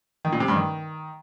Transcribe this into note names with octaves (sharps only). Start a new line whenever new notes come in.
D#3
A#2
C3
G2
D#3